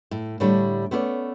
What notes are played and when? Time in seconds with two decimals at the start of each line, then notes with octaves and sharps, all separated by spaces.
0.11 A2
0.40 A2 D3 G3 A3 D4
0.91 A3 B3 C#4 C5 D5